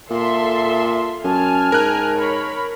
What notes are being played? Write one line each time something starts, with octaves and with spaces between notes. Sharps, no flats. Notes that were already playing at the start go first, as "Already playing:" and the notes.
A#2 A4 E5 C6
F#2 G#5 A5 F6
G#2 A#4 F#6
C#5 B5